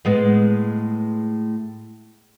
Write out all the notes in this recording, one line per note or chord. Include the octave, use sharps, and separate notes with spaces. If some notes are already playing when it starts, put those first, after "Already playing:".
A2 G#3 B3